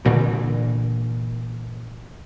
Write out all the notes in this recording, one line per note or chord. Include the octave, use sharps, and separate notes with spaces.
G2 A#2 D3 E3